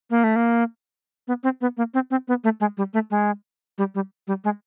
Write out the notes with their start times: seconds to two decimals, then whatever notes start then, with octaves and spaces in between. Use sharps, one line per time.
0.10 A#3
0.24 A3
0.36 A#3
1.28 B3
1.43 C4
1.61 B3
1.77 A#3
1.94 C4
2.10 C4
2.28 B3
2.44 A3
2.60 G#3
2.77 G3
2.93 A3
3.11 G#3
3.78 G3
3.95 G3
4.27 G3
4.44 G#3